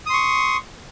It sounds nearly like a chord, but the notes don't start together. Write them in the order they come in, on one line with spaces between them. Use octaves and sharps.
D#6 C6 C#6